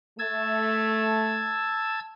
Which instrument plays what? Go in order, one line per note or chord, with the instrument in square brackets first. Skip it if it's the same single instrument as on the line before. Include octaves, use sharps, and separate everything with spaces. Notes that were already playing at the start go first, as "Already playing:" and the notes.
[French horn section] A3 [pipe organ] A5 E6 G#6